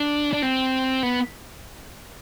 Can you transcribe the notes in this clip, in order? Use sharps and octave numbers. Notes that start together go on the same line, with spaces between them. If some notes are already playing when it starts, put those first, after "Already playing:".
Already playing: D4
D4
C4
B3